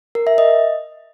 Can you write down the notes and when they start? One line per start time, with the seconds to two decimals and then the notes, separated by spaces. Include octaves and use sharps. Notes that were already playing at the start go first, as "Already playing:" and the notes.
0.15 A#4
0.27 E5
0.38 D#5